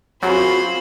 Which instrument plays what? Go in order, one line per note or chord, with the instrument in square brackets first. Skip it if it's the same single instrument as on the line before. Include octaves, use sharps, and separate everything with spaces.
[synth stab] F#2 [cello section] C4 F4 G#4 [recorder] F#4 [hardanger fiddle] C5 B5